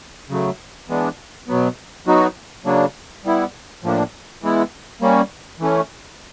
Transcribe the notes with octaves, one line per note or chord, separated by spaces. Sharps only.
C#3 F#3 A3
E3 G#3 B3 D4
B2 F#3 B3
F#3 B3 D#4 F#4
C#3 F#3 A#3 D4
G3 B3 E4
A2 F3 A#3 D4
E3 G#3 B3 E4
G3 A#3 C#4
E3 A3 C#4